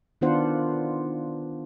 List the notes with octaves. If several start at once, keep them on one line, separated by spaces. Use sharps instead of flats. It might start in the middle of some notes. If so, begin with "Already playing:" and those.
D#3 B3 D4 F4 C5 F#5